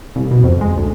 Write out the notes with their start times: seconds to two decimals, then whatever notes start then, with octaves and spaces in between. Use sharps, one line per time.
0.16 C2
0.31 B2
0.44 F2
0.61 G#3
0.77 D2